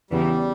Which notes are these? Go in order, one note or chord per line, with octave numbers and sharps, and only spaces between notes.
E2 C#3 E3 G3